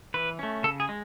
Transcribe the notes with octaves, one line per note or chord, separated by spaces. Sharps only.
E3 B4
A3 C#4
C#3 A4
G#4
G#3